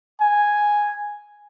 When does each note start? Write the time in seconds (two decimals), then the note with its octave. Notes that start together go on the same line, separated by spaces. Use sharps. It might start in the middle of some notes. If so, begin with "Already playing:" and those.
0.21 G#5